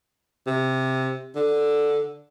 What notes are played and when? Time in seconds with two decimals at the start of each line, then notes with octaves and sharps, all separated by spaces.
0.47 C3
1.36 D3